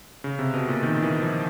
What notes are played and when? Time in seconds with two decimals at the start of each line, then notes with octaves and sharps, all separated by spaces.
0.24 C#3
0.39 C3
0.54 B2
0.68 A#2
0.83 D#3
1.02 E3
1.22 F3